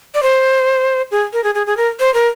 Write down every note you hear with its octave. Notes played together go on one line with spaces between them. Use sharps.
D5
C5
G#4
A#4
G#4
G#4
G#4
A#4
C5
A#4